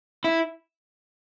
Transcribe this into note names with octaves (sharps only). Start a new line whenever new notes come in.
E4